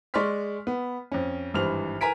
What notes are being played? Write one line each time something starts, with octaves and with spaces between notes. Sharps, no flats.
G#3 D5 C6 C#6 F6 B6
B3
F2 C#4
G#1 G2 E3 C5 F6 F7
A#4 B4 G#5 A#5 B6 D7